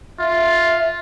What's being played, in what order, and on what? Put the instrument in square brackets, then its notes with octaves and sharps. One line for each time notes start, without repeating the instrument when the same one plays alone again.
[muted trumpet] F4 [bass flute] E5